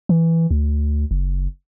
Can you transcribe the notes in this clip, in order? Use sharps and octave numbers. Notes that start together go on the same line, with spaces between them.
E3
D2
F#1